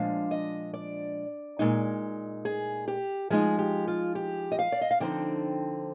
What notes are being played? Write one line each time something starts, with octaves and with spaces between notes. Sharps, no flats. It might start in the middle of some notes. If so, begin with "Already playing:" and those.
Already playing: A#2 F3 G#3 D4 F5
D#5
D5
A#2 G#3 D#4
G#4
G4
F3 G#3 D#4 G#4
G4
F4
G4
D#5
F5
D5
D#5
F5
D3 F3 C4 D#4 G5